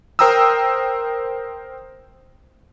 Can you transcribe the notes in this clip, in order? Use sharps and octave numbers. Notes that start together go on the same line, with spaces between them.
A#4 C5 G5 A#5 D#6 E6